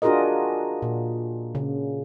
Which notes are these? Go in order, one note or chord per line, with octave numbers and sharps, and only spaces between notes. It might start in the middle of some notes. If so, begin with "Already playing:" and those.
D4 F4 F#4 G#4 A#4 D#5
A#2
C#3